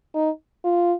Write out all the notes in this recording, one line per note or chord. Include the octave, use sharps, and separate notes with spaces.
D#4
F4